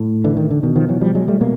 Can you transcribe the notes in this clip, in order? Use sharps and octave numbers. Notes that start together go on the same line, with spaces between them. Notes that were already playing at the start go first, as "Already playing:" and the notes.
Already playing: A2
D3 E3
D#3
D3
B2 D#3
D#3 F3
E3 F#3
F3 G3
F#3 G#3
G3 A3
B2 G#3 A#3